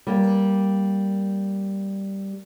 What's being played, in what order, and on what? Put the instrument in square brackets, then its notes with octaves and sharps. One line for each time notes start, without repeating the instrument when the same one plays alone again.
[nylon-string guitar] G3 A#3